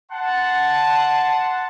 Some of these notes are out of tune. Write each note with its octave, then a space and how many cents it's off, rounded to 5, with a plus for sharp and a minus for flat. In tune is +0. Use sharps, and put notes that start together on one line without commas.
F#5 +0 A5 +0 C6 -10